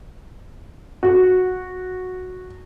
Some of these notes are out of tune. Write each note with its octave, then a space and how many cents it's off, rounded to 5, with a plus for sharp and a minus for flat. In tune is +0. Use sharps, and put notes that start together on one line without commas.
F#4 -10